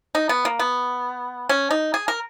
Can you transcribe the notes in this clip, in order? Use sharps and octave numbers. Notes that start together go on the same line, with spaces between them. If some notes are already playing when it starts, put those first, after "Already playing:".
D#4
B3
A#3
B3
C#4
D#4
G#4
A#4